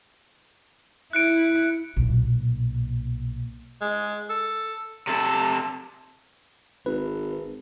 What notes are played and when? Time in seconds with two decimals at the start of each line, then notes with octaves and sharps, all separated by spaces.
1.13 E4 F#6 C#7 D7
1.97 B1 A#2
3.81 G#3
4.30 A4
5.08 C3 A4
6.86 G#1 B4